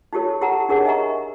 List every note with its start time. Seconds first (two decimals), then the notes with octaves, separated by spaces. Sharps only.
0.13 D#4 F4 G4 A4 C#5
0.41 E4 G4 A4 F#5 A5 A#5
0.69 D4 D#4 G#4 A#4 C#5 F#5
0.85 D#5 E5 G#5 A#5 C#6